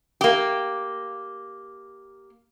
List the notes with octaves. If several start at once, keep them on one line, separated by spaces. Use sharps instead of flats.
A#3 G4